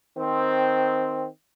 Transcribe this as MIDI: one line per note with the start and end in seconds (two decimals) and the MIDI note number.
0.18 1.27 51
0.18 1.27 60